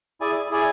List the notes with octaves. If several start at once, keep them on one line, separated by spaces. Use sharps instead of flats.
E4 G#4 D5 G#5
E4 G#4 D5 G#5